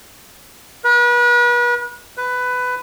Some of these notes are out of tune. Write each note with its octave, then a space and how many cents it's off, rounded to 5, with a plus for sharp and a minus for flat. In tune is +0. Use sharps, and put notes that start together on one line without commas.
B4 -35
B4 +15